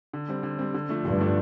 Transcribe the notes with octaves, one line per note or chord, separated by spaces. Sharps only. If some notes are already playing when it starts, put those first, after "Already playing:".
D3
G3 C4
D3
G3 C4
D3
F3 A3 D4
G2 D3
F3 A3 D4